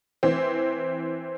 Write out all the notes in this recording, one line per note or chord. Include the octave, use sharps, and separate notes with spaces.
E3 C4